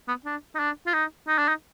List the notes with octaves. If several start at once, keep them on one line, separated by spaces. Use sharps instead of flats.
B3
D4
D#4
D4
F4
D#4
D#4
D4
D#4